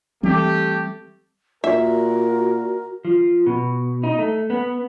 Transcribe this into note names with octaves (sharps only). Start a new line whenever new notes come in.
E3 G3 A3 C4 G4
A#2 F#4 A#4 E5
F3
B2
D#4
A3
B3